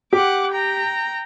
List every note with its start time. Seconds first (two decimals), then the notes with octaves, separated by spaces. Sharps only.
0.13 G4 F#5 D6
0.52 G5 A#5